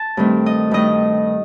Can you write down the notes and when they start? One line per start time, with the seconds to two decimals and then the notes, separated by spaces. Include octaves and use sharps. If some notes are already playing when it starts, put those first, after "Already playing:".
Already playing: A5
0.17 G2 D#3 A3 C4
0.46 D#5
0.71 G2 D#3 A3 D#5